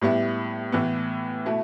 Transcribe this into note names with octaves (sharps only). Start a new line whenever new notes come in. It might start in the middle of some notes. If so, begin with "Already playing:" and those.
A2 G3 B3 E4
A2 E3 B3
B2 A3 E4